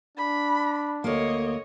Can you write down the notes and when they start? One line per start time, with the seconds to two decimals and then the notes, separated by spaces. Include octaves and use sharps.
0.18 D4 B5
1.04 D2 A#3 C#5 D#5